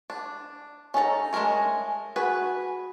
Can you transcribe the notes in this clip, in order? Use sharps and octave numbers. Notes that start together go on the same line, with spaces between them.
D4
C#4 D#4 A4 A#5
G#3 A3 E4 A#4 C#5
F#4 G#4 B4